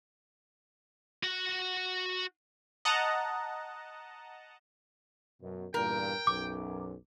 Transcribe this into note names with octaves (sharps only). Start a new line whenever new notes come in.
F#4 F#5
D#5 F#5 A5 A#5
F#2 B2
E2 G2 A#2 A#4 G5
B1 F#2 D6